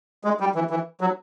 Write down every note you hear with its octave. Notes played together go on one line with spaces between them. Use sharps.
G#3
G3
E3
E3
F#3